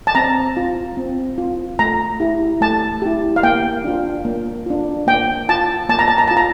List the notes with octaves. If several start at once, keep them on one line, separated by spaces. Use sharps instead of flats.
A5
C4 A#5
F4
C4
F4
A3 A#5
E4 G4
A3 A5
E4 G4
F5
A#3 G5
D4 F4
A#3
D4 F4
A#3 G5
F4 A5
A#3 A5
A#5
A5
A#5
F4 A5
A#5